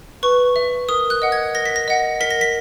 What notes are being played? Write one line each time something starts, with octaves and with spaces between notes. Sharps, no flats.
B4 C#6
E5
A#4 D#6
F#6
D#5 F#5
G#6
A#4 A#6
B6
A#6
D#5 F#5
A#4 B6
A#6
B6